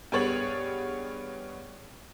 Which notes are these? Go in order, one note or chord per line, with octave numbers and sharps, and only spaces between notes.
G2 B3 G#4 C#5 A6 F#7